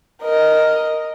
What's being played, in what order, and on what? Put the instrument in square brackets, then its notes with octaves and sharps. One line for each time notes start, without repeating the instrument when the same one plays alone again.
[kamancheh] A#4 D#5